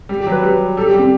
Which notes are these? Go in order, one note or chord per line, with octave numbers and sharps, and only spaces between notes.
G3
G4
F#3
B4
G3
G3 A4
G4
G3
C4